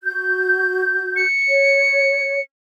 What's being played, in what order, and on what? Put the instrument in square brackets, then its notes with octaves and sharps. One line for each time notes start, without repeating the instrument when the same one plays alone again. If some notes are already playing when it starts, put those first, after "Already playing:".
[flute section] F#4 G6
[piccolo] C#7
[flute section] C#5